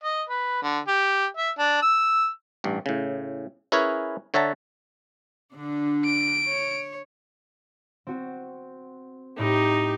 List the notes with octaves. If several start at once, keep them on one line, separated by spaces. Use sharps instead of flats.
D#5
B4
D3
G4
E5
D4
E6
A1 G2
A2 C#3
C#4 E4 G#4 A#4 B4 C#5
D3 C#5 E5 F#5 A5 A#5
D3 D4
D7
C#5
C4 F#4
A2 D#4 G4